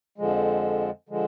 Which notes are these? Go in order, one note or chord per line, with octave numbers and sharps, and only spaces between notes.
F2 D3 F3 G#3
D3 F3 G#3